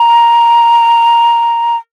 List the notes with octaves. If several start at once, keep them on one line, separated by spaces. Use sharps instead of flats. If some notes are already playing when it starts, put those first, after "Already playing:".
Already playing: A#5